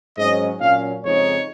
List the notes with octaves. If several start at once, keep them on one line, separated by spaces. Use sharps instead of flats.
G#2 F#3 C#4 D#5
A#2 F#3 C#4 F5
F2 C#3 G#3 D#4 C#5